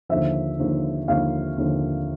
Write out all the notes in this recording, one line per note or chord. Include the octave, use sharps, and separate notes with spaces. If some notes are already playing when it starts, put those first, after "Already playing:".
D#2 D3 F3 E5
D#2 D3 F3
D#2 D3 F3 F5
D#2 D3 F3